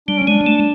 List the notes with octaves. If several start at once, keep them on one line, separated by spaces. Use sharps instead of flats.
G3 D4
C#4
G#3 D4
A3